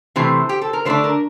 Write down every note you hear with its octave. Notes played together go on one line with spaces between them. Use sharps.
C3 E3 A3 C5
G4
A4
A#4
D3 A3 D4 C5
A#4